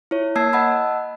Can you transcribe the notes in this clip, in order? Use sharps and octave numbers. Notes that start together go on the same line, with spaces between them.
E4 C#5
A#3 A5 E6 G#6 C7
D#5 F#5 A5 B5 E6